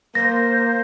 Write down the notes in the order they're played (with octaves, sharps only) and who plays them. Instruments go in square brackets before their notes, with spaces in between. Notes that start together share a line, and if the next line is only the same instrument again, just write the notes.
[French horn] A#3 [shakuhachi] C5 [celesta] A#6